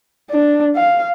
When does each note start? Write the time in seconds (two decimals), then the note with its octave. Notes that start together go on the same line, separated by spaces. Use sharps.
0.31 D4
0.76 F5